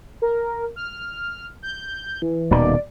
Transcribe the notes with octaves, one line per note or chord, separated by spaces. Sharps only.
A#4
F6
G6
E3
D#1 B2 D#3 D5